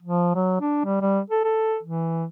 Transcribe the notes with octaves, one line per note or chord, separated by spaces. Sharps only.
F3
F#3
D4
G3
G3
A4
A4
E3